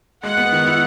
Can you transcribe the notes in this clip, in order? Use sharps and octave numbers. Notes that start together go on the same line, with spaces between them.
G#3 F#5
B3
D#3
E4